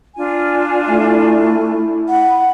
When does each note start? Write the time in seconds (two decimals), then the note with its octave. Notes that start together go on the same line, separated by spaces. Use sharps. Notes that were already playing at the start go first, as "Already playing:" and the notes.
0.17 D4 F4 G#5
0.87 A3 E4
2.08 F#5 B5